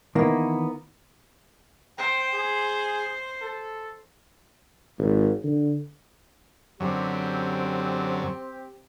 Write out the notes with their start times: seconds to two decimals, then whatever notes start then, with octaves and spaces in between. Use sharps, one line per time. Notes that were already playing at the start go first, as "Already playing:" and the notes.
0.15 D#3 E3 A#3 B3
1.98 C5 G5
2.33 G#4
3.42 A4
4.99 G#1
5.44 D3
6.80 F#2 D3 F#3 C4 G4